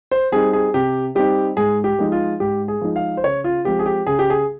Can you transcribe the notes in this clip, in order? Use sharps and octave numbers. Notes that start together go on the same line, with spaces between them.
C5
G3 C4 D#4 G#4
G#4
C3 G4
G3 C4 D#4 G4
G#2 G#4
G4
F3 G#3 D#4
F4
G#2 G4
G#4
F3 G#3 D#4
F5
C5
C#3 C#5
F4
F3 G#3 C4 G4
G#4
G4
C#3 G#4
G4
G#4